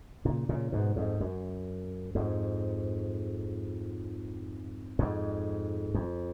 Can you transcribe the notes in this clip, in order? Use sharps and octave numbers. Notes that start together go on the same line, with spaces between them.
A#2 C#3
A#2 C#3
G#2 B2
F2 G#2
F#2
F2 G#2
F2 G#2
F2